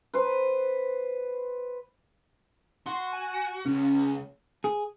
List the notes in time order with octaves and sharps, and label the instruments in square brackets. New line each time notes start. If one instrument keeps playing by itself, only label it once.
[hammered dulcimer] B4 C5
[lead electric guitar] F#4 [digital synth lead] C6
[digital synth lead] G#5
[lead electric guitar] C#2 [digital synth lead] C#4
[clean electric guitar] G#4